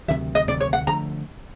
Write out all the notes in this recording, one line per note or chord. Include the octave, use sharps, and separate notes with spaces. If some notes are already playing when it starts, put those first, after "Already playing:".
D2 C3 D#3 F#3 E5
D#5
D2 C3 D#3 F#3 D5
C#5
F#5
D3 F3 A3 A#5